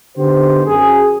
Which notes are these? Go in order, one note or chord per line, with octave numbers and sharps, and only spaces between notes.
D3 B3 D#4 G4 C5
F#2 G#4